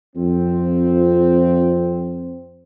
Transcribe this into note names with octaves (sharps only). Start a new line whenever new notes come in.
F2 C4